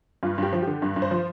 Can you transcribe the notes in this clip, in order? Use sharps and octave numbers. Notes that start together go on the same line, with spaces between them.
G2 F4
G2 G4
F3
D3 G4
G2
G2
C5
F3